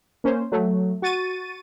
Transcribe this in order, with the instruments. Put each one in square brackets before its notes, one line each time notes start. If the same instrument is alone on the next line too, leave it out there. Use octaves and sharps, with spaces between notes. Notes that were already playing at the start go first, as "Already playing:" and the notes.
[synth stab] A#3 C#4 C5
F#3 A3
F#4 C#6 A6 D#7